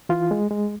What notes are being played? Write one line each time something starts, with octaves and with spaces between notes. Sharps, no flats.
E3 F4
G#3
G#3